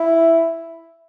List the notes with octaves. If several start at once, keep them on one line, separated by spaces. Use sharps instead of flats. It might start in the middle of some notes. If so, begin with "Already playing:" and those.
Already playing: E4